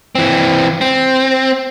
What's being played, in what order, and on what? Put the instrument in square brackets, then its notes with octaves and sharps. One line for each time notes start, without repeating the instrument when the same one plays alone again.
[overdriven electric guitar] E3 C4
C4